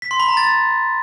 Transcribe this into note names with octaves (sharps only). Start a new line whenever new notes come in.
B6
C6
B5
A#5
A6